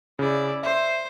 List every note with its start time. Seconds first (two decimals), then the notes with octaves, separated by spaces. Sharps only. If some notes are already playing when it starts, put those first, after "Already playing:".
0.19 C#3 E4 D5
0.63 C5 E5